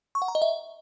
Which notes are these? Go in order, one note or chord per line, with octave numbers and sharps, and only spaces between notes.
C#6
F#5
A#5
D#5
E5